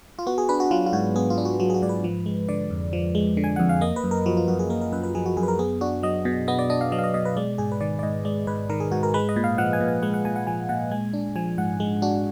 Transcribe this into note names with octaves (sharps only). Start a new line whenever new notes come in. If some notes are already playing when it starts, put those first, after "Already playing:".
F4
B3 F#4
G#4
D4 B4
F#4
F#3 F4
F4
G#2 F#4
B3 G#4
F4
D4
F#4
F#3 F#4
G#4
F#4
G#2 D5
B4
F3
G#3
D3 D5
F2
F3
G#3
D3
G#5
F2 F#5
F5
A#3 D#5
B4
F#2
A#4
F3 F#4
F4
F#2 F#4
G#4
A#3 A#4
A#4
F#2 B4
B4
F3 G#4
F#4
F#2 G#4
B4
A#4
B3 G#4
D4 F#4
F#3 D#5
B2
B3 D#5
D5
D4 D#5
F5
F#3 D#5
F5
D#5
B2 D#5
B4
G#3 D5
G#2 G#4
B4
D#3 D5
D5
G#2 D#5
G#3 D5
G#2 B4
D#3 A#4
G#4
G#2 F#4
A#4
G#3 B4
D#5
A#2
F5
F3 F#5
G#5
A#2
G#5
G#3 F#5
F#5
A#2 G#5
F#5
F3 G#5
A#2 F#5
G#3 G#5
D4
F3 G#5
G#2 F#5
G#3
D4 F#4